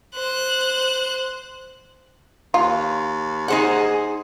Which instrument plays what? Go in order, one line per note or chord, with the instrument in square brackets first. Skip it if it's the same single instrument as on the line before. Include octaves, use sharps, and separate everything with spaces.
[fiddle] C5 F#6
[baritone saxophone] D#2 [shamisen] F4
[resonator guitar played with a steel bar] D#4 C5 F#5 [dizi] G#4